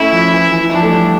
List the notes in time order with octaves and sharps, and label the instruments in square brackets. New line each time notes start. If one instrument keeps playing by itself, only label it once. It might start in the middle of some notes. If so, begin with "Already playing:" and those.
Already playing: [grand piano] A3 C#4 [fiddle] E4
[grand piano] F3
E3
E3
[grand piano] F3 [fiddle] D4
[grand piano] A3
G3